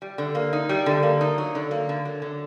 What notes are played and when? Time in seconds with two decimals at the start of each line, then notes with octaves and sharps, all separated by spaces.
0.02 G3
0.18 D3
0.35 A#3
0.53 D#4
0.69 G3
0.86 D3
1.03 A#3
1.21 D#4
1.38 F#3
1.55 D3
1.71 A#3
1.89 D3
2.05 F#3
2.22 D3